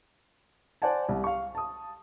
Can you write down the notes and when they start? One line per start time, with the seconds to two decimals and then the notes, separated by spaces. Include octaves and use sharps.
0.82 C5 D5 F#5 G#5 A5
1.09 C2
1.24 F5 C#6
1.55 A5 D#6